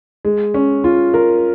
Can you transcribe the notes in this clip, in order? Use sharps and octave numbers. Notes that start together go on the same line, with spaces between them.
G#3
C#4
F4
A#4